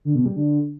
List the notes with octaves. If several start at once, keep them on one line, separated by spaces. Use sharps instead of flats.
D3
B2
G3
D3